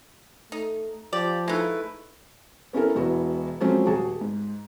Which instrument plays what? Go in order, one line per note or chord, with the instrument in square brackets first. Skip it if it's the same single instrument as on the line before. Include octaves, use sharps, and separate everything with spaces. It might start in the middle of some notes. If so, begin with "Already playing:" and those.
[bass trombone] A3 [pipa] D#4
[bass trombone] F3 [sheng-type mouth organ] G4 [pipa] D5
[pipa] G#3 D#4 [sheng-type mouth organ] A3 E4 B4
[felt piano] B3 C#4 E4 A4 A#4
E1 B3 E4 F#4
F3 F#3 G#3 A3 C4 C#4
D#1 F#4 G#4 A5
G#2